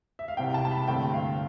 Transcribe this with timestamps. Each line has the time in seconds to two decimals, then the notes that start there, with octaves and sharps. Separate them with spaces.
0.19 E5
0.28 F5
0.37 C2 C3 G3 C4 G5
0.54 A5
0.65 A5
0.71 B5
0.88 G2 D3 A3 C4 G5
1.14 F5